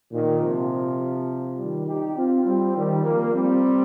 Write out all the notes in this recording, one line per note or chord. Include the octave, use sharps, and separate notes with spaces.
A#2 D#3
C3 F3
D#3 G3
D#4 G4
C4 F4
G3 C4
D#3 G3
F3 A#3
G3 C4